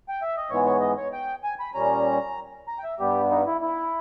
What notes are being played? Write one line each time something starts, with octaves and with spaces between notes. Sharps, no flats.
G5
E5
D#5
G#2 E3 G#3 B3 C#5
C#5
D#5
C#5
G5
G#5
B5
A#2 G3 C#4 A#5
A#5
G5
E5
G2 G3 B3 G4
D#4
E4
E4